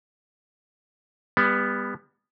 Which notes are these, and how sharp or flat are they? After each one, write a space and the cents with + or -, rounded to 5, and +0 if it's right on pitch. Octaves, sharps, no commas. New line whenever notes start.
G3 +35 B3 +0